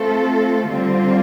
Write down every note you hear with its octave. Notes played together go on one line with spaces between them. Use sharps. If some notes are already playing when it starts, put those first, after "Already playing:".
Already playing: A3 C4 F4 A4
D3 G3 C4 F4